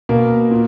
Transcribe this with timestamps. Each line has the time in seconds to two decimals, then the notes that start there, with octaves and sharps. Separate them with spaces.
0.09 B2 A#3 A#4
0.51 A#2